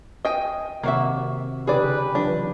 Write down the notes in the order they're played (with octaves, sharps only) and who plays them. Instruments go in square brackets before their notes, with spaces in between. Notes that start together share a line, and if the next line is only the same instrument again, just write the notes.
[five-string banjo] D#5 G5 G#5
[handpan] C3 D#3 C4 [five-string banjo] A#3 F#4 E5
[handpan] C#3 D#4 G4 [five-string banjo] G#4 D5 [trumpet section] B4
[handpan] E3 F#3 F4 [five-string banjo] D4